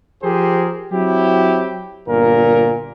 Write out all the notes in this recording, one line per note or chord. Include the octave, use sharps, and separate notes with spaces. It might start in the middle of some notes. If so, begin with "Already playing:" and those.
F3 G4 G#4 A#4 C5
F#3 C4 E4 G4
G1 A#2 A#4